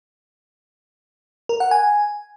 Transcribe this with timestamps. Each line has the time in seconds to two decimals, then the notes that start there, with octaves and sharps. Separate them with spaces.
1.49 A#4
1.60 F#5
1.71 G#5